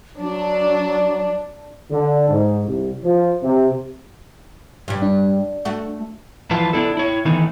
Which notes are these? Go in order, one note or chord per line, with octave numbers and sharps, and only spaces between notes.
F#3 D4
D3
G#2
C2
F3
C3
G2 G3
D4
A3 F#4
E2 F3 E4 F4 B4 A5
B3 D4 E4 A4
E4 C#5
D#3 E3 A3 B3 D#4